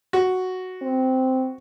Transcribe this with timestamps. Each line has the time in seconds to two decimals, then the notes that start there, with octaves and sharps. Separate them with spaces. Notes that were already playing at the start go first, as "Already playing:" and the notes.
0.13 F#4
0.82 C4